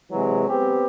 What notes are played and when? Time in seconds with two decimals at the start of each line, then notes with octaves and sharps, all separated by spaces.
0.10 C3 E3 F#3 G#3
0.47 B3 C4 G4